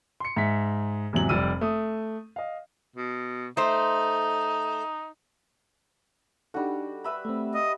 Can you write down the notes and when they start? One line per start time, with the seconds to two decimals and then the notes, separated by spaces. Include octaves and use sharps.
0.20 C6 C#7
0.37 G#2 E5 B6
1.13 E2 G#2 C3 F#3 F#7
1.29 F1 G3 G4 E6 D#7
1.61 A3 D#6
2.36 D#5 F5
2.96 B2
3.57 A3 D#4 C5
6.54 G3 D4 D#4 F#4 A4
7.04 B4 E5 B5
7.25 A3 C4
7.54 D#5